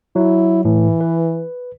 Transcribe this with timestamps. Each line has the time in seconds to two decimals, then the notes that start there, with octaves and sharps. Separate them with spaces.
0.16 F#3 E4
0.65 A2 E3
1.01 B4